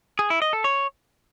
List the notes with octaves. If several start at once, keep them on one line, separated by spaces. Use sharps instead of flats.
G#4
E4
D#5
A4
C#5